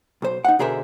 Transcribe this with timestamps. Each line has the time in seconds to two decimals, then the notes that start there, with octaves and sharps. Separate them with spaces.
0.22 B1 C5
0.45 D#4 F#5
0.59 B2 D3 G#4 A#4 C5 E5